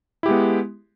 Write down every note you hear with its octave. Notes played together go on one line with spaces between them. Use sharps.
G#3 B3 E4 G4